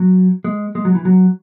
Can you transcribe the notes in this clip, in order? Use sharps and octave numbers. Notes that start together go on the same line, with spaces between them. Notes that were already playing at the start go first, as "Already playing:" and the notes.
Already playing: F#3
G#3
G#3
F#3
E3
F#3